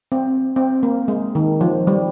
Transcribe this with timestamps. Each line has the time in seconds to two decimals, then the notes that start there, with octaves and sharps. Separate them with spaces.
0.12 C4
0.56 C4
0.83 A#3
1.08 G#3
1.35 D#3
1.61 F3
1.87 G3